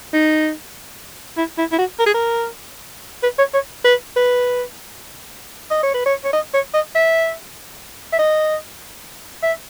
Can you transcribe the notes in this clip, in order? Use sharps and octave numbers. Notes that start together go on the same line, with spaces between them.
D#4
E4
E4
E4
F#4
A#4
G#4
A#4
B4
C#5
C#5
B4
B4
D#5
C#5
B4
C#5
C#5
D#5
C#5
D#5
E5
E5
D#5
E5